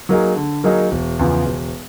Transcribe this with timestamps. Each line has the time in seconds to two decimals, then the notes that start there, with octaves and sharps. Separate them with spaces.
0.09 F#3 A#3 D#4 G#4
0.36 D3
0.64 F#3 A#3 D#4 G#4
0.91 E1
1.19 E2 C#3 F3
1.46 E1